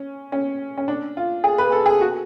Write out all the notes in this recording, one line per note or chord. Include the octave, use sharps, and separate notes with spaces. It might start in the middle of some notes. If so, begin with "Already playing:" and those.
Already playing: C#4
C#4
C#4
D4
F4
G#4
B4
A4
G#4
F#4